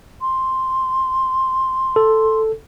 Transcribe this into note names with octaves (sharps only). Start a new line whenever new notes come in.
C6
A4